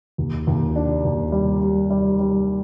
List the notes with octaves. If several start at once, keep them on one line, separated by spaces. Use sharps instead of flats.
D#2
D#2
D4
D#2
G3
G3
G3
G3